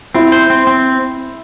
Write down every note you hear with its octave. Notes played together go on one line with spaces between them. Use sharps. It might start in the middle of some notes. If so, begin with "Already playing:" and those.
C4 E4
C5
C4
C4